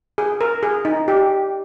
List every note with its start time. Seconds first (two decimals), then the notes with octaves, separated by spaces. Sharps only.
0.18 G#4
0.41 A#4
0.63 G#4
0.85 D#4
1.08 G4